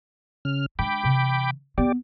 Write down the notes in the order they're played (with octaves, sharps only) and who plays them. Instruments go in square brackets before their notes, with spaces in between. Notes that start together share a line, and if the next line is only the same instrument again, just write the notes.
[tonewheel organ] C#3 F6
[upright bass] G#3 D4 [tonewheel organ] G5 B5 D6
[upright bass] C3 E3
[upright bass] B3 [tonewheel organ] G4 D5